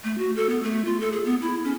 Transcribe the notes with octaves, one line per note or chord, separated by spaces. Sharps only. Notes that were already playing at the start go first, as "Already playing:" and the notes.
A3
F#4
A4
B3
A3
F4
A4
G#4
B3
E4
C#4